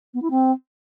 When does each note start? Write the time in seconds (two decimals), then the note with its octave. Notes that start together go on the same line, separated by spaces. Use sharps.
0.14 B3
0.22 E4
0.30 C4